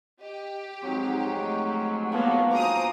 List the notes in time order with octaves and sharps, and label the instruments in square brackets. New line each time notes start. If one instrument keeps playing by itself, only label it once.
[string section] G4 [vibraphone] D#5
[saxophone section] F2 G#2 F#3 [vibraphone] C4 D#4
[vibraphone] A3 D#5
[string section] A#3 B3 [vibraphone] F4 C#6 [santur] C#5 F5 A5
[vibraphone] D4 F4 F#4 [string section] C5 A#5 D#6 [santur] G#5 D6